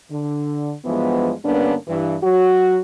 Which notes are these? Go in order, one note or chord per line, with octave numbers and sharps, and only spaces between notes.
D3
G2 E3 F3 G#3 B3
G2 D3 A#3 B3 C#4 D4
G2 E3
F#3 F#4